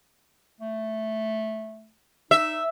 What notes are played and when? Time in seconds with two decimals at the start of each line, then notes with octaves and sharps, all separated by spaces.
0.61 A3
2.31 D#4 E5